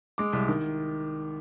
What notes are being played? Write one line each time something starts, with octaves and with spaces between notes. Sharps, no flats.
G#3 D6
C2
D#3